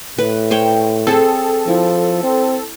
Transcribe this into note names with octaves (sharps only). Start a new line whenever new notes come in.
A2 B4
C5 C#5 G5
C4 G#4 A4
F3 E4
C4